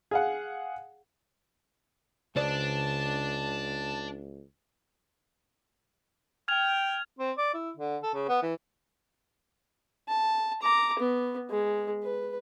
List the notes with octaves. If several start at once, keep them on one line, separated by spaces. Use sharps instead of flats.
G#4 F5 F#5
C#2 C#3 D4 C5 D5 A5
G5 F6 G#6 F7
C4
D5
E4
D3
A4
C#3
B3
E3
A5
A#5 D6
B3
G#3
B4